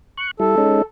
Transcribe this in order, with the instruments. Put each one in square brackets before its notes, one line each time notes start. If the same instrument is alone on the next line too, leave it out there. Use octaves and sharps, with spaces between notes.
[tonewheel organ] C#6 F#6
[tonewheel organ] G3 E4 [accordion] A4
[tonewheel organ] G#3 C#4 D#4